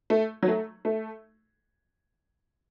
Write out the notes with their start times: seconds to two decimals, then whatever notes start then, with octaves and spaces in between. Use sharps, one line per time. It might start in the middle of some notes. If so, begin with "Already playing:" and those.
0.10 A3
0.43 F#3
0.47 A3
0.85 A3